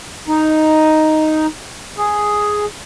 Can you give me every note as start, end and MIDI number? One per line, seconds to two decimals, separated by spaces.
0.28 1.47 63
1.98 2.66 68